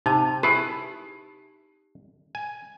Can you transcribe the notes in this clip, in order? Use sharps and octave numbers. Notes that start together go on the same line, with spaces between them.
C3 D#4 A5
E4 G4 G#4 B4
G#5